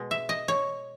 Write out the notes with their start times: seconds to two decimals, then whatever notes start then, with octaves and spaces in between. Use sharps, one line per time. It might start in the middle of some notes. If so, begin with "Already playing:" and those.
Already playing: B2 G#3
0.11 E5
0.29 D#5
0.48 C#5